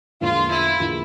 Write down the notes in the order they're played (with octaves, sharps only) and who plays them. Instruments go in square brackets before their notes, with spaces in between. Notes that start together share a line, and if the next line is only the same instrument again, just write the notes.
[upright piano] E1 E2 D3 F3 A#3 [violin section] F4
[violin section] E4
[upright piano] E2 D3 F3 A#3